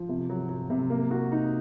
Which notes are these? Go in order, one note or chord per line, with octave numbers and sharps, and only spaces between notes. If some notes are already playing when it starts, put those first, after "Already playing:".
Already playing: F3
C3
F#3
F#3
C3
A#3
F#4
D#4